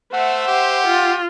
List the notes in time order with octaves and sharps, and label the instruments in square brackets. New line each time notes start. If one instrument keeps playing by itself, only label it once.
[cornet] A3 [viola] C5 E5 [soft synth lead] F#5
[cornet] G4
[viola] F4